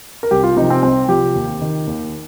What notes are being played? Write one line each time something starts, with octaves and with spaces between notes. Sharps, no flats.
A#4
C2 G4
F4
C3 F3 D#4
C4
C2 C4
C3 F3 G4
D#2
D#3
D#2